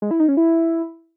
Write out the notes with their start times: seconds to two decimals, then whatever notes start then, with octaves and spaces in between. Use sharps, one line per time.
0.02 G#3
0.11 E4
0.20 D#4
0.28 C#4
0.37 E4